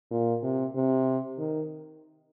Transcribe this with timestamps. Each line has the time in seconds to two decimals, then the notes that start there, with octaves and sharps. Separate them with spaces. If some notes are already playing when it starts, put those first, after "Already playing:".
0.11 A#2
0.43 C3
0.75 C3
1.38 D#3